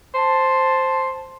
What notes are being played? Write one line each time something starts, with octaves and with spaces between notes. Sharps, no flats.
C5 A5